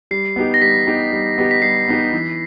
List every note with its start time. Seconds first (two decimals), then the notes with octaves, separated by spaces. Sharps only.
0.11 G3 C7
0.36 B3 D#4 G4
0.54 A#6
0.62 G3 B6
0.87 B3 D#4 G4
1.12 G3
1.38 B3 D#4 G4
1.51 B6
1.62 G3 C7
1.88 B3 D#4 G4
2.12 E3